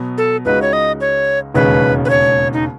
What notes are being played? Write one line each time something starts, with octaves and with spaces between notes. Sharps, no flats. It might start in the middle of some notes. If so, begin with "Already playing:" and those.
Already playing: B2 F#3 B3
A4
C#2 C#3 G#3 D#4 F#4 B4
C#5
D#5
C#5
E1 D#2 C#3 G#3 C#4 B4
B4
C#5
D#4